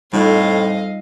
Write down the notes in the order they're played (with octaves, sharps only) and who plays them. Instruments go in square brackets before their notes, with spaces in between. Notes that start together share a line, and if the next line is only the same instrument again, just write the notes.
[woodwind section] F2 [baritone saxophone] A2 [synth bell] G3 D#4 F4 [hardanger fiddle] D#5 F5